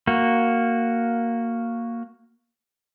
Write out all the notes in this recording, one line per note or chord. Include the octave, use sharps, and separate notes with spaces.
A#3 F#4